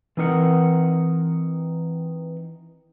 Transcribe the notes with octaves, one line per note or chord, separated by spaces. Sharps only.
E3 C4 D#4 A#4 F#5